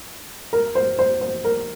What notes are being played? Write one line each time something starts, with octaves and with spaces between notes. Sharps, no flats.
A#4
C5
C5
C5
A#4